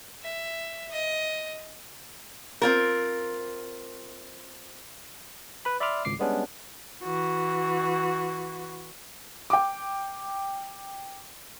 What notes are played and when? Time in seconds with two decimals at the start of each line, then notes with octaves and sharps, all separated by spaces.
0.22 E5
0.90 D#5
2.62 C4 F4 A#4
5.65 B4 B5
5.80 D5 E5 B5 C6 D6 F6
6.05 G#1 C#2 D6 C7
6.19 G3 G#3 B3 C#4 D4
7.03 E3 F#4
9.50 G5 D6